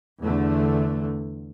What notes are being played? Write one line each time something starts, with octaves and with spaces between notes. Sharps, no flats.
E2 D3 A3